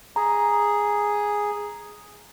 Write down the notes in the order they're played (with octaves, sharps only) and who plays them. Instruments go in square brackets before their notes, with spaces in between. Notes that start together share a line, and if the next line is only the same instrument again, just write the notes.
[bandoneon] G#4 [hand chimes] A#5